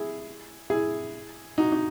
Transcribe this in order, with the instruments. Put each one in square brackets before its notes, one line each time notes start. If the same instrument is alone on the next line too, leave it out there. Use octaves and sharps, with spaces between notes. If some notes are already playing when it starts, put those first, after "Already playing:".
Already playing: [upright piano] E4 G#4
E4 G#4
D#4 F#4
D#4